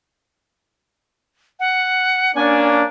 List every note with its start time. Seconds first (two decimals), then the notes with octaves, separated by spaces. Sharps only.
1.60 F#5
2.35 A#3 C#4 D4 G#5